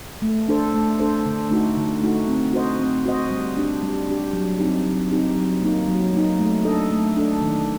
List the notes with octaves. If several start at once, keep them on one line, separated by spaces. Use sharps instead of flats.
A3
D4 A4 C5
A3
D4 A4 C5
D3
A3 D#4 F#4
D3
A3 D#4 F#4
C4
F#4 C5 D#5
C4
F#4 C5 D#5
G3
D4 G4
G3
D4 G4
F#3
C4 D#4 G4
F#3
C4 D#4 G4
F#3
A#3 D#4
F#3
A#3 D#4
A3
D4 A4 D#5
A3
D4 A4 D#5
D#3